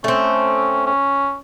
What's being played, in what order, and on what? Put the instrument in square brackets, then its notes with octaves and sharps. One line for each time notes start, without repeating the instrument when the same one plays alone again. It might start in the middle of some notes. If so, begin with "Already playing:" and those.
[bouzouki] A3 C4 [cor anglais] C#4
[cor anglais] C#4